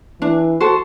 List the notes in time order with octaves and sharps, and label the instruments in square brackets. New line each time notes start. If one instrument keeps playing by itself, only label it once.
[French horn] E3 [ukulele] D4
[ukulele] F#4 A4 C5